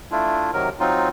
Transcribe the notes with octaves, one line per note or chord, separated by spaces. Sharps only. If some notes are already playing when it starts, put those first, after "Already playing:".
A3 D4 E4 F4
C3 D#3 F#3 A#4
F#3 C4 D#4 F4